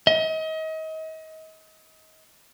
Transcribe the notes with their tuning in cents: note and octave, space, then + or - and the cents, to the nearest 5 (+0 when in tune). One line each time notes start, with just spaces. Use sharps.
D#5 +35